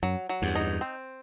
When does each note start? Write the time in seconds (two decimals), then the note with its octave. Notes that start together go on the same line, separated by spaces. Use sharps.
0.03 F#2 F#3
0.29 F#3
0.42 E2 G2
0.55 D#4
0.81 C4